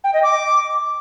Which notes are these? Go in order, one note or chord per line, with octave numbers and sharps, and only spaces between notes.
G5
D#5
D6